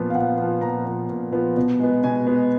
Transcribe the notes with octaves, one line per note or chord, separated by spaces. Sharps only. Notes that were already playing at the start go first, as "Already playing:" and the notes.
Already playing: A#2 F3 B3
F5
A#2 F#5
F3 B3
A#2 A#5
F3 B3
A#2
F3 B3
B2
G#3 B3
B2 G#5
G#3 B3